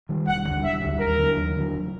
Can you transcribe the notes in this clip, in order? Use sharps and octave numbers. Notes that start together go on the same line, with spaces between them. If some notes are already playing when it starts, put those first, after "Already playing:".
D#3 G3
E1 F#5
D2 D3 G3
E1 E5
D2 D3 G3
D#2 A#4
D3 F#3
D#2
D3 F#3
F1